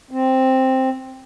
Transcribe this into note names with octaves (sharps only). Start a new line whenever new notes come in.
C4